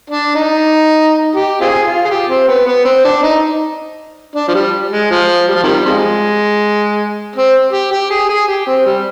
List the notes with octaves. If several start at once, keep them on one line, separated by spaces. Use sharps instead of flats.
D4
D#4
G4
C4 F4 G#4
F4
G#4
G4
C4
B3
B3
C4
D4
D#4
D4
F3
G3
G#3
F3
G3
F3
C3 D#3 G3
C3 F3 G#3
C4
G4
G4
G#4
G#4
G4
C4
G3